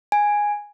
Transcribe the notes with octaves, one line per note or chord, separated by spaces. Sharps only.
G#5